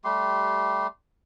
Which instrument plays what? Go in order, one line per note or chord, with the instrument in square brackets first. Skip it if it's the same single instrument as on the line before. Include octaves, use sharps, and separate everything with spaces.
[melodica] G3 A3 G4 C6